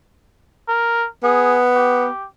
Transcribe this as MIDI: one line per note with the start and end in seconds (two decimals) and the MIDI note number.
0.68 1.07 70
1.24 2.07 59
1.24 1.60 68
1.76 2.26 67